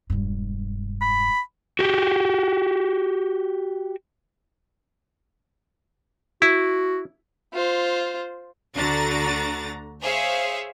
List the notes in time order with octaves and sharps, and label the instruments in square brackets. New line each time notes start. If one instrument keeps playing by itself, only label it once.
[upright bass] E1 G2
[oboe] B5
[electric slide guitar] F#4 G4
[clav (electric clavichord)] E4 [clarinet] F#4
[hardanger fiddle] F4 C5
[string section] D2 D3 F#4 A#5 A6
G#4 C5 C#5 E5 F5